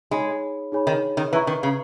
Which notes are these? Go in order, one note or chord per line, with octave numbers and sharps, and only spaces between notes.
G#3 D#4 G#4 C#5 G#5 B5
D#4 G#4 C#5 G#5 B5
D#3
D#3
E3 B4 E5 A#5 C#6
D#3
C#3